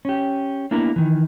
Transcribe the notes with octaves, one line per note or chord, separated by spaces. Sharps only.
C#4 G4
A#3 B3 D4 E4 A#4
D#3 E3